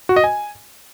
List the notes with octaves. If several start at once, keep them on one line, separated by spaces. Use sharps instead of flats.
F#4
D#5
G#5